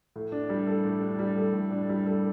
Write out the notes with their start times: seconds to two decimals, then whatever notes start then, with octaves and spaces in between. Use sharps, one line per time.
0.16 A2
0.32 D4
0.49 G3
0.67 A4
0.85 A2
1.02 D4
1.19 G3
1.37 A4
1.53 A2
1.71 D4
1.89 G3
2.06 A4